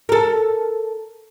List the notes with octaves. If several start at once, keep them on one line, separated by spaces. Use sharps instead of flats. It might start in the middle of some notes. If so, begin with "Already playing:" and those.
A4 A#4